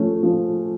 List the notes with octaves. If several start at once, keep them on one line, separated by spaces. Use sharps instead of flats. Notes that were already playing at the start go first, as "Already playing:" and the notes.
Already playing: F3 A3 C#4
F3